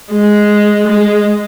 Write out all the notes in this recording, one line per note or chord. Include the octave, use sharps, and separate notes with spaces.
G#3
G#3